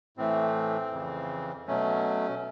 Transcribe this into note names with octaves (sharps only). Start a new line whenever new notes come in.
A2 E3 A3 C4
F2 C#3 E3
B2 F#3 A3 C#4